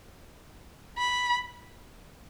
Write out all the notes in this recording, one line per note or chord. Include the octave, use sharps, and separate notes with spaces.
B5